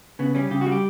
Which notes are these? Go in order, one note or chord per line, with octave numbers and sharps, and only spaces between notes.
C#3 B3
G3 C#4
C#3 G4
G3 F#4
G4